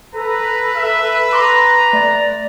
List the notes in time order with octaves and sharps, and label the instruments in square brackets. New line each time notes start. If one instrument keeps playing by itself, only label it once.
[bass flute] A4 [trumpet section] B4 [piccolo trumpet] A#5
[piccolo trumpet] E5
[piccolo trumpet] A#5 [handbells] C6 D6
[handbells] A3 A6 [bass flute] D5